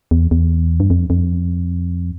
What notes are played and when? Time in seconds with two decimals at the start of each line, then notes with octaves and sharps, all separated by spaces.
0.11 E2
0.31 E2
0.80 G2
0.90 F2
1.10 F2